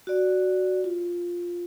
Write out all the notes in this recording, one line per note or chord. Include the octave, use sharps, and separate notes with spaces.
F#4 D5
F4